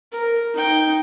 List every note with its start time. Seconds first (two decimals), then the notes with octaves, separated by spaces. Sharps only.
0.12 A#4
0.54 D#4 G5